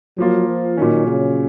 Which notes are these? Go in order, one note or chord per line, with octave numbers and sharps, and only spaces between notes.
F3 F#3 A#3 F4
F3
A#2 D#3 F#3 C#4
C#3